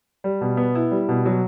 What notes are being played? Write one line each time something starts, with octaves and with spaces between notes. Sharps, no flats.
G3
B2
B3
E4
G3
B2
F#3